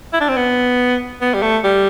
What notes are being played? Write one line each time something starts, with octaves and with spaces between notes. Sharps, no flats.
E4
D4
C4
B3
B3
G3
A3
G3